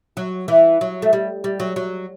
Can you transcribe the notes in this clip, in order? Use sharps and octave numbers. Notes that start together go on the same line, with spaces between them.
F#3
E3
F#3
A3
G3
G3
F#3
F#3